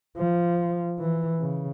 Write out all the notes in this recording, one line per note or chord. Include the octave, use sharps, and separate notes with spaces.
F3
E3
C#3